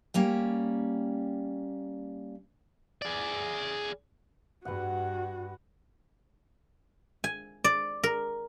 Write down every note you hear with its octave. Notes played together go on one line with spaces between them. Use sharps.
G3 A#3 C#4 G5
G#4 D5
G2 F#4 B4 F#5
G#5
D5
A#4